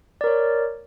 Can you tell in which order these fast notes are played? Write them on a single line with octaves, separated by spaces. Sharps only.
D5 A#4 C#5